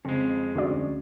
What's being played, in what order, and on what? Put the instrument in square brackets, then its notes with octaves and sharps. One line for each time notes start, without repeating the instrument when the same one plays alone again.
[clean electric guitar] F2 G#3 [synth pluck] C#3 C4
[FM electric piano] D2 [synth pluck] C#4 F#4 D5